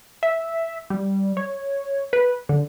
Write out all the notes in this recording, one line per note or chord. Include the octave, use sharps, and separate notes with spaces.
E5
G3
C#5
B4
D3